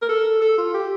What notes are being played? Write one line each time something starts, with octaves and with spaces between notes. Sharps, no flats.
A#4
A4
A4
F4
G4